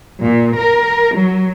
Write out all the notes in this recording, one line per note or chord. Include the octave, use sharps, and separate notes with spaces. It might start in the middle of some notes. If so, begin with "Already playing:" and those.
A#2
A#4
F#3